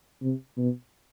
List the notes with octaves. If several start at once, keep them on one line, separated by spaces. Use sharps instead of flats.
C3
B2